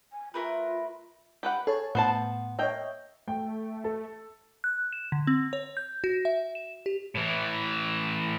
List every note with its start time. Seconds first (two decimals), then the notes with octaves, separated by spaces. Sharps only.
0.13 G#5
0.34 A3 F4 A#4 B4
1.43 G4 B4 F#5
1.67 G#4 A4 C#5 A5
1.95 A2 B3 C5 A5
2.59 A#3 C#5 D#5 E5 G5
3.28 A3 G5
3.84 A4
4.64 F#6
4.93 E7
5.12 D3
5.27 C4
5.53 C#5
5.77 G6
6.04 F#4
6.25 E5
6.55 E7
6.86 G4
7.15 A2 E3